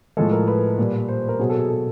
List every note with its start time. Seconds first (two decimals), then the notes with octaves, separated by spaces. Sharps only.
0.17 A2 F3 G#3 A4
0.32 A#4
0.48 B4
0.78 A#2 G3
1.08 C5
1.29 A#4
1.39 B2 F#3 G#4
1.49 A4
1.59 G#4
1.69 A4